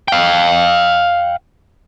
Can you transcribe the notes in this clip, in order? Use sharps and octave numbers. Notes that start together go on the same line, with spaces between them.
F5 G5